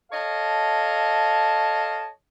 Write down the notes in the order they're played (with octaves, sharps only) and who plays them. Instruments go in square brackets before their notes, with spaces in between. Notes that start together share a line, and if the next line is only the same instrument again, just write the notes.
[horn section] A4 C#5 D#5 F5 A5